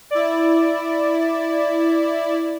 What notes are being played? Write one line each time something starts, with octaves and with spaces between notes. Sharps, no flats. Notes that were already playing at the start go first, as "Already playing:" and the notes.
E4 D5